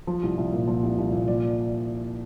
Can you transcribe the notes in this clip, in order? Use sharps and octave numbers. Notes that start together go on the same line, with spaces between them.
F3
C2
C2
A#2
F3
C2
C2
A#2
F3 D5